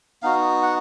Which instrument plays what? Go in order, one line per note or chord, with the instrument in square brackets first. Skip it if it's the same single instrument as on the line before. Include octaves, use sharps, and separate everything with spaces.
[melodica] B3 D#4 F#4 F5
F#5